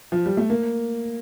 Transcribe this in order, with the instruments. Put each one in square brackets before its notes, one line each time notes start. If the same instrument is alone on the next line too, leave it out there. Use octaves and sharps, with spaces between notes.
[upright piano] F3
G3
A3
A#3